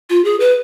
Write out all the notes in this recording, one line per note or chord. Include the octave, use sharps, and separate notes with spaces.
F4
G#4
B4